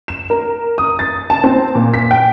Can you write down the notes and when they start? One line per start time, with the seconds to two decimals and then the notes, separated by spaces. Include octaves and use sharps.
0.08 E7
0.30 A#4
0.78 D#6
0.99 A6
1.30 A5
1.44 C4
1.75 A#2
1.94 B6
2.11 G5